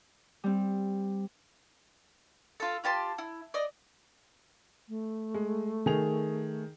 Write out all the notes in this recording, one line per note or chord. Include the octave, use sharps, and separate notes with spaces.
G3 C4
F4 A4
F4 G4 A5 C6
E4
D5 D#5
A3
G#3
D#3 G#4 F7